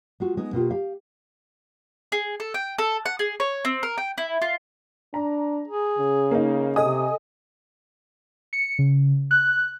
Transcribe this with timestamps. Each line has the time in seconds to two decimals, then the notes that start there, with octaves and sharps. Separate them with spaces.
0.20 G#3 F4 F#4
0.37 G#3 B3 D#4
0.53 B2 A#3 F4 G4
0.71 G4 F5
2.12 G#4
2.40 A4
2.54 G5
2.78 A4
3.06 F#5
3.19 G#4
3.40 C#5
3.65 C4
3.83 A#4
3.98 G5
4.18 E4
4.42 F4
5.14 D4 A#5
5.67 G#4
5.99 C#3
6.31 A#3 D#4
6.76 C3 A4 D#5 G#5 D#6
8.53 C#7
8.79 C#3
9.31 F#6